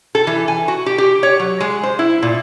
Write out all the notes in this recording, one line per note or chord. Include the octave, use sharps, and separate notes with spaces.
A4
E3
G#5
F#4
G4
G4
C#5
F#3
G#3
C5
E4
A#2